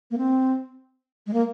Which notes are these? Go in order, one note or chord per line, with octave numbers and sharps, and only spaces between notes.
A#3
C4
G#3
A#3